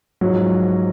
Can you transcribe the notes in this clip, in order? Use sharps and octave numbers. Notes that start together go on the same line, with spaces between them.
G#2 F3 F#3